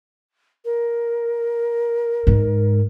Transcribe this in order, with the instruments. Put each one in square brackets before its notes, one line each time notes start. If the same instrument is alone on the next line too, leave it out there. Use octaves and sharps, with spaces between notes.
[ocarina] A#4
[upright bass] G#2